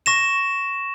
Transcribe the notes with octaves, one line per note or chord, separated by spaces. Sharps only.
C#6 A#6 E7